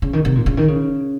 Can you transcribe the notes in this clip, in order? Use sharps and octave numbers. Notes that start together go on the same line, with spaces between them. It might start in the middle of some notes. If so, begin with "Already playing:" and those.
C#3
D#3
C3
A#2
C#3
D#3
C#3